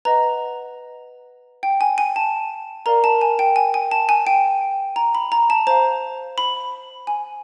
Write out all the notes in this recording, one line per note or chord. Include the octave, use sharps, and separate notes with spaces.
B4 D#5 F#5 A#5
G5
G#5
G#5
A5
A#4 D5 F5 A#5
A5
G#5
G5
G#5
G#5
A5
G#5
G5
A#5
B5
A#5
A5
C5 F5 A#5
B5
G#5